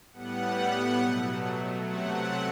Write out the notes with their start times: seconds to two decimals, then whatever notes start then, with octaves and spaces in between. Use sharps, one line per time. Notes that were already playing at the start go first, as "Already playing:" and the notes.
0.13 A2 G3 B3 F#5
0.98 B2 F#3 A3
1.84 C3 F#3 A3 F#5